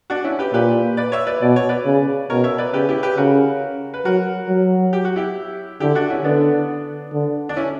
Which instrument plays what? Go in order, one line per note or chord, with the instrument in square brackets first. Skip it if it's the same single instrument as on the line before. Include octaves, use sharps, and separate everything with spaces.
[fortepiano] D4 F#4
C#4 E4
G4 B4
[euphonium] A#2 [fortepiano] G4 B4
[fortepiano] B4 D5
C#5 E5
B4 D5
[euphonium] B2 [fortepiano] D5
[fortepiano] C#5
B4 D5
[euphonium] C#3
[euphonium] B2 [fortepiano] A#4 C#5
[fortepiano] C#5 E5
B4 D5
[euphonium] C#3 [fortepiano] G4 B4
[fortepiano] E4 G4
G4 B4
[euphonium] C#3 [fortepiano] F#4 A#4
[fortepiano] B4
[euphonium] F#3 [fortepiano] F#4 A#4
[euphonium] F#3
[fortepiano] G4
F#4
E4 G4
[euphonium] D3 [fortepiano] E4 G4
[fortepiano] D4 F#4
C#4 E4
[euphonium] D3 [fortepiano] B3 D4
[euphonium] D3
[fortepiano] D4
C#4 E4